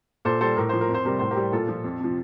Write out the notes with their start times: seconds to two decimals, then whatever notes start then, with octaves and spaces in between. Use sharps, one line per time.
0.25 A#2 A4 C5
0.41 G3 A4 C5
0.57 A2 A#4
0.69 F3 C5
0.81 A#4
0.88 F2
0.94 C5
1.05 C3 G3 A#4
1.19 A2 C5
1.31 G4 A#4
1.37 G3
1.52 A#2 F4 A4
1.68 F3
1.84 F2
2.00 C3 F3